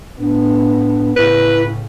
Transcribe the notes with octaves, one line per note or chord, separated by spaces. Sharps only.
A2 B3 D4
A2 C#3 E4 B4